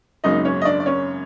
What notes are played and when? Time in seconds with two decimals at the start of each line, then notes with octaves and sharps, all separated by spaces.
0.24 G#1 F#2 C#3 F#3 A#3 D#4 D#5
0.45 C#4 C#5
0.62 D#5
0.65 D4 D5
0.80 D5
0.86 C#4 C#5